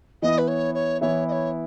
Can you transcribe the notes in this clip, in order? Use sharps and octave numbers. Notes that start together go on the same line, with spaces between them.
E3 B3 E4 D#5
B4
C#5
C#5
E3 B3 E4 C#5
D#5
C#5